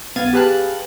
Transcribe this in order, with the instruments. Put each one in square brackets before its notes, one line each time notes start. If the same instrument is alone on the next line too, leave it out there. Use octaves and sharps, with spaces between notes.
[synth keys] B1 B3 F5 G#6 A6 D#7
G4 G#4 B4 F5 A5 F#6